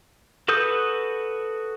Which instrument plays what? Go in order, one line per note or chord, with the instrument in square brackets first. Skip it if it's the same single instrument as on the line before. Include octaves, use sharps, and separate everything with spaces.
[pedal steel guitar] F#4 A4 B4 D#6 G6